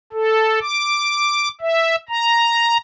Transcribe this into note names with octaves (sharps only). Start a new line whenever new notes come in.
A4
D6
E5
A#5